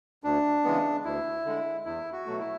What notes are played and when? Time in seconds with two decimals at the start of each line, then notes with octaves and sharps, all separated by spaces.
0.24 D2 D4
0.64 C#3 E3 G#3 B3
1.04 D2 E4
1.45 D3 G#3
1.85 E2 E4
2.12 F#4
2.26 B2 F#3 A3
2.39 E4